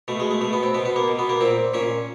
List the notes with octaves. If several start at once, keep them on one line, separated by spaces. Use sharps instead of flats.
B2 A3
G#3
A3
B2 A3
B3
C4
B2 B3
B3
A#3
B2
B3
A#3
A#2 C4
A#2 C#4